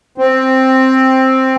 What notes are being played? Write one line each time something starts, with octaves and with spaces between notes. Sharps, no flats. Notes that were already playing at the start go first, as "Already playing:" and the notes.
C4